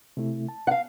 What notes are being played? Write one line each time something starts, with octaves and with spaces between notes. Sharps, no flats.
C3 A3 E4
A5
F5 F#5